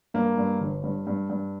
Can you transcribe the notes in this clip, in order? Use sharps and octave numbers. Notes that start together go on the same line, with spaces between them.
G2 A#3
G2
G1
G2
G2
G2